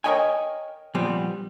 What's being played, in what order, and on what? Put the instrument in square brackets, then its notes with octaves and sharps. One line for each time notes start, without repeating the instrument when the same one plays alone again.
[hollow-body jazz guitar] A#4 C5 C#5 D#5 G5 G#5
A#2 F3 G3 B3 C4